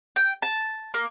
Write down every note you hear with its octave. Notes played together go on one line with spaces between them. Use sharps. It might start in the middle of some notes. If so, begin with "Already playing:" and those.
G5
A5
A#3